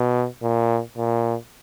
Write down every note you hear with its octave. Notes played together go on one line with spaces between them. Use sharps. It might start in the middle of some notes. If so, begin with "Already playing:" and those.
Already playing: B2
A#2
A#2